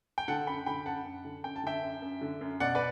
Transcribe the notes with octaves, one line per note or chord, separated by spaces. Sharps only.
G5
D3 F#5 A5
F#2 G5 B5
D3 G5 B5
F#2 F#5 A5
F#2
D3
F#2 G5
A5
D3 E5 G5
F#2
F#2
D3
F#2
B2 D5 F#5
B4 D5